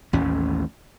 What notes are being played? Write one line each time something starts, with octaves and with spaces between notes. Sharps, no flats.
A1 D#2 A2 C#4